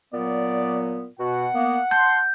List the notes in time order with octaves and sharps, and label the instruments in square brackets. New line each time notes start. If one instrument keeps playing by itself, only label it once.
[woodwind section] A#2 F#3 B3 [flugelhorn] D5
[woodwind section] B2 F#4 [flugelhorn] F#5
[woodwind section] A#3 B3
[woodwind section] A5 C6 [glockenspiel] G6